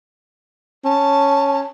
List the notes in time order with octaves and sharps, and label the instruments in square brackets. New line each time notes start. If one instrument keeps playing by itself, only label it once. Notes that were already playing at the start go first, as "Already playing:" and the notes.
[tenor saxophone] C#4 [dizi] A5